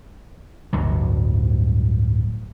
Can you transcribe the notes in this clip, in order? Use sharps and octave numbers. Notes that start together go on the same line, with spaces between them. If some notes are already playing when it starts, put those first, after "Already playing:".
D1 G1 D2 F#3